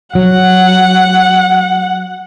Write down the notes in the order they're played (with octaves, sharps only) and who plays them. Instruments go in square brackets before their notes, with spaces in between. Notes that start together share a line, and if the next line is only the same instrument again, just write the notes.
[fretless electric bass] F#3 [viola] F#5